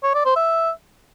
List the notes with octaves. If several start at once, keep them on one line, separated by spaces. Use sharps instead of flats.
C#5
D5
C5
E5